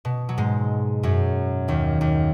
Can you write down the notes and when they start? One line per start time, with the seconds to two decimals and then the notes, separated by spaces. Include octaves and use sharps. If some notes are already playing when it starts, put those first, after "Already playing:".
0.05 B2
0.29 F#3
0.38 G#2 G#3
1.03 F#2 F#3
1.68 D#2 D#3
2.01 D#2 D#3